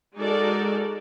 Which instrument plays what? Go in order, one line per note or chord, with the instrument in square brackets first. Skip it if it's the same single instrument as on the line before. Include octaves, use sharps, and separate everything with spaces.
[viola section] G#3 D#4 F#4 A4 A#4 D5